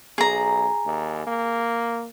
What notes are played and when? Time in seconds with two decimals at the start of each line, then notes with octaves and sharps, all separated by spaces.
0.18 B1 G#4 A#5
0.86 D#2
1.27 A#3